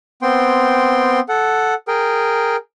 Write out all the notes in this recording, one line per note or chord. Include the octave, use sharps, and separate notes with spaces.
B3 C4 G5 C6
A4 F#5
G#4 A#4 G5